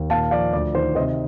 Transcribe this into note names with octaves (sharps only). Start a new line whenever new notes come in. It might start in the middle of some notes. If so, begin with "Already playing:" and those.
Already playing: D#2
A#2 F5 A5
F3 D5 F5
D2 D5
D#3 C5
C3 C5 D#5